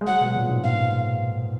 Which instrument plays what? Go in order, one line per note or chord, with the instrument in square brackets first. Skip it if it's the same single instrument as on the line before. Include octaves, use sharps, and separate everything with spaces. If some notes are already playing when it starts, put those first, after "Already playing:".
[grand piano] G#3
[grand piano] F#3 [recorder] F#5
[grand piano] B2
A#2
G#2
[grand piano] G#2 [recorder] F5